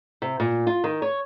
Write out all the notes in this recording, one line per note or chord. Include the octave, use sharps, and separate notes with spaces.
C3
A#2
F4
D#3
C#5